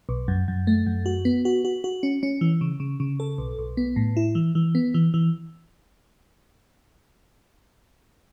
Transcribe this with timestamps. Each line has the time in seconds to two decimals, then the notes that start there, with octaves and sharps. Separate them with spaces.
0.09 B1
0.28 F#2
0.48 F#2
0.67 A3
0.86 F#2
1.06 F#4
1.25 B3
1.45 F#4
1.65 F#4
1.84 F#4
2.03 C#4
2.23 C#4
2.41 E3
2.61 C#3
2.80 C#3
3.00 C#3
3.20 A4
3.38 B1
3.59 B1
3.77 B3
3.96 A2
4.17 E4
4.35 E3
4.55 E3
4.75 B3
4.94 E3
5.14 E3